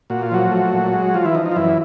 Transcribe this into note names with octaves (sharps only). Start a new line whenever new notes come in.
A#2 F#4
F4
F3 F#3 F#4
A3
A#2
G#3
F3 F4
E3 E4
F3 D#4
D#4
F4
F#2 E3 E4